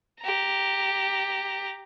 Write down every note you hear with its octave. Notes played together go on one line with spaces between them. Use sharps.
G4 A#5